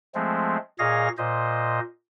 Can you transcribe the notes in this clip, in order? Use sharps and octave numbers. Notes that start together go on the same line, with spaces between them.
F3 G#3 A3 C4
A#2 G#4 C#5 D#5 F5 A#6
A#2 C5 D#5